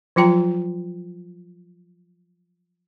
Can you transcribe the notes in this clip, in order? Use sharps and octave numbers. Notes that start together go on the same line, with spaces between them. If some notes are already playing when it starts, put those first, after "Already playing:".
F3 F#3 F4 G5 A#5